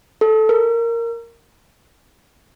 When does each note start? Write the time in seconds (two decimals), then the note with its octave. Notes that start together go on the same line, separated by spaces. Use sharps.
0.21 A4
0.49 A#4